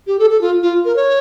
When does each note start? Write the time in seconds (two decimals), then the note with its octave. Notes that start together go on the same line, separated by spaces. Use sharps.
0.07 G4
0.19 A4
0.30 A4
0.41 F4
0.63 F4
0.85 A#4
0.96 C#5